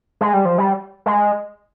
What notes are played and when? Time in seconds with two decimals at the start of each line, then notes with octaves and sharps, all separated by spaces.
0.21 G#3
0.33 G3
0.45 F3
0.58 G3
1.06 G#3